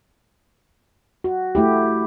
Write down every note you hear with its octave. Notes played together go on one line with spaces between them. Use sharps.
F#4
A3 E4 G4